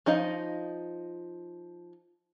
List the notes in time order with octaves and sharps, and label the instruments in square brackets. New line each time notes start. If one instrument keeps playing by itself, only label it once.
[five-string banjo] F3 D#4 D#5 F5